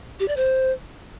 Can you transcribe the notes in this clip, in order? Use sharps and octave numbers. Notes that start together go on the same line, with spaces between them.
G4
D5
C5